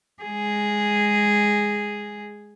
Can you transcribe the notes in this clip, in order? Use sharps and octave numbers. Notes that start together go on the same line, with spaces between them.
G#3 G#4